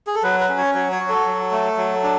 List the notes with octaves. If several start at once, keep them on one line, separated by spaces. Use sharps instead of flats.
G#4
A4
F#3 B4
B4
C#4
C#5
F#3 C#5
C#5
F#4
A4
F#3
A3
F#3
D4